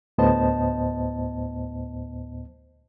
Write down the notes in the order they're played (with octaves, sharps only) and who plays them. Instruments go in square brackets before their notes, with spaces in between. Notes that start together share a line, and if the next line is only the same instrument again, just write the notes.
[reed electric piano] D2 A2 B3 C5 D#5 A5